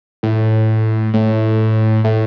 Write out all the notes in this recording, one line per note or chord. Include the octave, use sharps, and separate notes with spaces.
A2
A2
A2